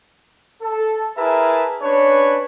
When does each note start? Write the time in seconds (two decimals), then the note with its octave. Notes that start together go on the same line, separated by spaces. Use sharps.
0.62 A4
1.18 E4 G#4 A#4 B4 E5 A5
1.83 C#4 D4 B4 C#5